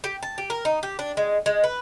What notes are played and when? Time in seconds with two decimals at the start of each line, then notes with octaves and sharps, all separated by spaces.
0.04 G4
0.23 A5
0.38 G4
0.50 A#4
0.65 D#4
0.83 G4
0.99 D4
1.17 G#3
1.46 G#3
1.64 B4